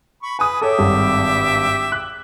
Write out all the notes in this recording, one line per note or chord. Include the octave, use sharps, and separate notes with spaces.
B5 C#6
B4 G#5 D#6
A4 C#5 E5 G5 D6
G#1 G2
F#6